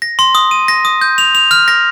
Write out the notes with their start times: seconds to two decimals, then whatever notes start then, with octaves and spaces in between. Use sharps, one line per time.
0.02 A#6
0.19 C6
0.35 D#6
0.51 D#7
0.68 A#6
0.85 D#6
1.01 G6
1.18 F7
1.35 F7
1.51 F6
1.68 A#6